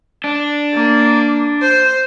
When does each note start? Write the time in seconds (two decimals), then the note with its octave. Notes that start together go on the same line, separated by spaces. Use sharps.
0.24 D4
0.73 A#3
1.61 C5